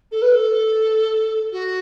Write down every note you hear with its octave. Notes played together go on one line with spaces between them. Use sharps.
A4
B4
A4
F#4